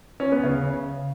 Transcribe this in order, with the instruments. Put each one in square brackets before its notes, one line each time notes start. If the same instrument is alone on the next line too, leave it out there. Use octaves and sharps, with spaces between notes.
[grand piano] C#4
B3
C#3